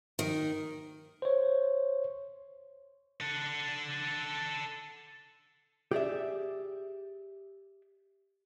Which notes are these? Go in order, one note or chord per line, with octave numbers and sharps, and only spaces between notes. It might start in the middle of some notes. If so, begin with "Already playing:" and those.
D#3
C5 C#5
A4 F#5
G4 G#4 D5 E5